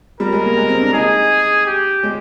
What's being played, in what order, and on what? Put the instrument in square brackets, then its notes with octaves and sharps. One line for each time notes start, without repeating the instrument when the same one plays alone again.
[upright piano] G3 [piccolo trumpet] A#4
[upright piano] G#3
A#3
G#3
C4
D4
[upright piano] D#4 [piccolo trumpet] G#4
[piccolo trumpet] G4
[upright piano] G#3